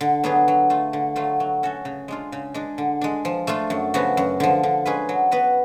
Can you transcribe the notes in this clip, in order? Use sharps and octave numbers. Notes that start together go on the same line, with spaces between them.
D3
F#3 B3 D4 G#4
F#3
A3 F4
D3
F#3 A3 F4
F#3
C#4 F#4 A4
C#3
G#3 D4 F4
C#3
G#3 D4
D3
G#3 D4
F3
A3 D4 F4 A4
F#2
C#3 F3 B3 F#4
F#2
D3 F3
D3
G#3 C#4 G#4 B4
F#3
B3 F#4 B4